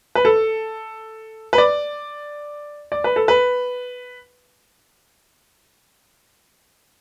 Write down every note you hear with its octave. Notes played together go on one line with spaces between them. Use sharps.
B4
A4
B4
D5
D5
B4
A4
B4